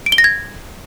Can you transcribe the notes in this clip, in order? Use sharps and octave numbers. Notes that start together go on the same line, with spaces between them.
D7
G7
A#6
G#6